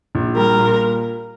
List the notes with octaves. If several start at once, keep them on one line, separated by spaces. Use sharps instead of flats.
A#1
G3 A#4
A#2